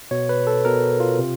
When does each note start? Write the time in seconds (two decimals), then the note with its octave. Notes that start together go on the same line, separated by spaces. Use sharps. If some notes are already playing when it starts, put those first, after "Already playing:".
0.11 B2 C#5
0.29 B4
0.47 A4
0.65 B2 A#4
1.00 F4
1.19 C3